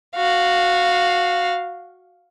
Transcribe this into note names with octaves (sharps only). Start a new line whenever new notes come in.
F#4 F5